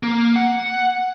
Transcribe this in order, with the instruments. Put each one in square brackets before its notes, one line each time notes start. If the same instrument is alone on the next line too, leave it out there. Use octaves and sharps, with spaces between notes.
[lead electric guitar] A#3
F#5